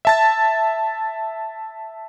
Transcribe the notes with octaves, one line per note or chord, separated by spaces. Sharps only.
E5 A5 A6